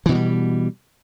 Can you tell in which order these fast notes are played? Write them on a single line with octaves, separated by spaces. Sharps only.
E3 B2 F3 G3